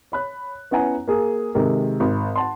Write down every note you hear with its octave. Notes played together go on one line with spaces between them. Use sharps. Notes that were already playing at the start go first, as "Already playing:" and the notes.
C#5 B5 F#6
B3 C#4 E4 F#5 G#5 A#5
A#3 G#4
C3 D#3 G#3 G4 A4 A#4
G#1
F#5 A5 C6